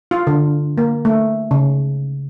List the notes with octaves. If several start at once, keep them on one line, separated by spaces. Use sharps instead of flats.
F4
D3
A#3
A3
C#3